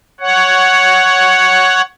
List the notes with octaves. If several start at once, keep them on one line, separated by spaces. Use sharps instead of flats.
C#5 F#5